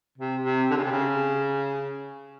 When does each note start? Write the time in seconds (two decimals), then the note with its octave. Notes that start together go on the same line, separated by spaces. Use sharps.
0.18 C3
0.44 C3
0.70 D3
0.77 C#3
0.84 C3
0.91 C#3